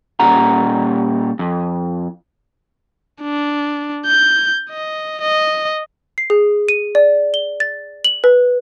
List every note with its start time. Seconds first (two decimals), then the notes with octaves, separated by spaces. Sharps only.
0.20 A#2 G3 C#4 A#4 F#5 A#5
1.39 F2
3.22 D4
4.07 G6
4.70 D#5
5.21 D#5
6.18 C7
6.30 G#4
6.69 D#7
6.95 D5
7.34 G7
7.60 A6
8.04 F#7
8.24 B4